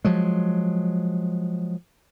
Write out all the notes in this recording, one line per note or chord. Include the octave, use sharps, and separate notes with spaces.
F3 F#3 G#3